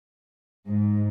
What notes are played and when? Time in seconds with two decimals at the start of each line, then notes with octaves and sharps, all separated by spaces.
0.67 G#2